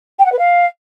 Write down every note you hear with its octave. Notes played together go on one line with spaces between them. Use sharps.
G5
F#5
B4
F5